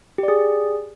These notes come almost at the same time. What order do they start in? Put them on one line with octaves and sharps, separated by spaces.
G4 D5 G#4